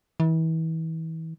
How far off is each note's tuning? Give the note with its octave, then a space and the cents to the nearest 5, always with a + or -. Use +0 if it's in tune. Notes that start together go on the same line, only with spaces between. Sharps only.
E3 -35